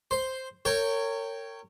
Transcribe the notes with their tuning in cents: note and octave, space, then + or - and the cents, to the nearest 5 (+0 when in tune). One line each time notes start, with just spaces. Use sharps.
C5 +0 C6 -5
A#4 -35 C#5 +0 G5 +0